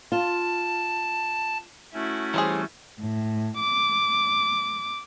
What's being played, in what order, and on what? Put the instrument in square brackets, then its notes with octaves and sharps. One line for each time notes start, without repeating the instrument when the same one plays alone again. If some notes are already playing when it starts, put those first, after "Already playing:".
[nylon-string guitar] F4 [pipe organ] A5
[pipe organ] A3 C#4 [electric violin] E4 F#4
[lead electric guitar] E3 G3 [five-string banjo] G#4 C5 C#5
[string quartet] A2
D6